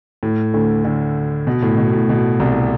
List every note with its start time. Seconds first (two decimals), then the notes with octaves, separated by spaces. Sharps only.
0.23 A2
0.54 D2 D3
0.85 D2 D3
1.47 B2
1.62 A2
1.78 B2
1.93 A2
2.09 B2
2.40 C2 C3